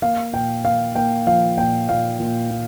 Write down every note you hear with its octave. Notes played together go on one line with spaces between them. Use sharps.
A#3 F5
A#2 G5
A#3 F5
A#3 G5
F3 F5
A#2 G5
A#2 F5
A#2
A#2